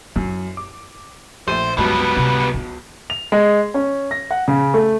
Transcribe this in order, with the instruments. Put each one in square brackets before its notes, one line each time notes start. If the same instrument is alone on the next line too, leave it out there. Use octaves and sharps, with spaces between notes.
[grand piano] F#2 [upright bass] E4
[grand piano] D6
[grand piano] A#1 A3 D#7 [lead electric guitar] C5
[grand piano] C#2 F#3 A5 [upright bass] G2 [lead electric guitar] G3 B3
[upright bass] C3
B3
[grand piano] F7
G#3
C#4
A#6
F#5
C#3
A3